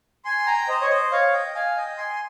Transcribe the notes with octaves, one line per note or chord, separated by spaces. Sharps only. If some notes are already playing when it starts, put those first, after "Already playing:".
G#5 C6
G5 A#5
C5 D#5
C#5
C5 D#5
C#5 F5
D#5 G5
F5 G#5
D#5 G5
G#5 C6